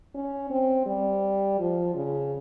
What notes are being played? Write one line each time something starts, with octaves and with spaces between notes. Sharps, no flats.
C#4
C4
G3
F3
C#3